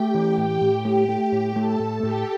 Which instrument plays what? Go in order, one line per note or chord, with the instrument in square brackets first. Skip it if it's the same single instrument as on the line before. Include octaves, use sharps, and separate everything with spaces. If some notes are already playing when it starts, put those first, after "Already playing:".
Already playing: [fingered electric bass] A3 [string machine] G4 G5
[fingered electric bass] E3
A2
A2
A3
A3
A2
[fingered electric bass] A3 [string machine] A4 A5
[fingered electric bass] A2
[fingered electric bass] A2 [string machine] G4 G5